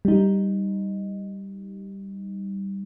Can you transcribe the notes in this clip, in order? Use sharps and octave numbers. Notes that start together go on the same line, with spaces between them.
G3 D#4